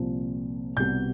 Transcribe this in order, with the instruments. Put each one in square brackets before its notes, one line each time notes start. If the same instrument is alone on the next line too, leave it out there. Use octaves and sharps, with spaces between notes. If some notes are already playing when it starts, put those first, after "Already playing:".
Already playing: [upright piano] C2 A#2 F3
C2 B2 G3 B3 G6